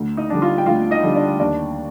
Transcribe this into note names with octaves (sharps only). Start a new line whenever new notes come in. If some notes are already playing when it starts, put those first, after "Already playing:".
Already playing: D2
D#4 D#5
D3 G3 D4
F4 F5
G5
D2 F4 F5
D#4 D#5
D3 G3 D4
D4 D5
D#2 D4 D5